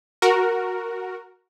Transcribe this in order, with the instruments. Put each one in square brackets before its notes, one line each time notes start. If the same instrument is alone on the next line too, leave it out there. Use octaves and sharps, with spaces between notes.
[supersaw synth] F#4 A#4